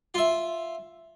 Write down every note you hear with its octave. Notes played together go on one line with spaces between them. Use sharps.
F4 E5